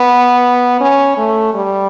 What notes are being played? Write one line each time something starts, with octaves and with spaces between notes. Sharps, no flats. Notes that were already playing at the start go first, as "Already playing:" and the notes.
Already playing: B3
C#4
A3
G3